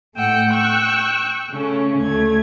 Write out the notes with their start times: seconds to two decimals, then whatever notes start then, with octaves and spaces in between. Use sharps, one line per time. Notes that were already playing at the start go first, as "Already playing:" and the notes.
0.16 A2 A3 F#5 G5 E6
0.51 G5 C#6 E6 F#6
1.50 C#3 A3 C#4
2.00 D2 A3 G#6